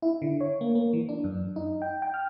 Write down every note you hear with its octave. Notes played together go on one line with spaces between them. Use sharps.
E4
D3
C#5
A#3
A#3
E3
D4
F#2
D#4
G5
G5
F6